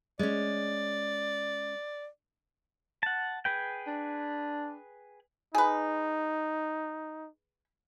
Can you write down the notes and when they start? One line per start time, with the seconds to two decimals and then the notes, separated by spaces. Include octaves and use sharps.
0.19 G#3 C#4 D5
3.03 F#5 A5
3.45 G#4 B4 G5
3.87 D4
5.55 D#4 G#4 B4